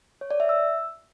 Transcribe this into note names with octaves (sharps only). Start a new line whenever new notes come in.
C#5
D5
E5
E6